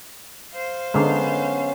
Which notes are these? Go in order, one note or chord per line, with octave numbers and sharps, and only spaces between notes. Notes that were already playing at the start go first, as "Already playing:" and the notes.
C5 F5
D3 F#3 G#3 B3 C#4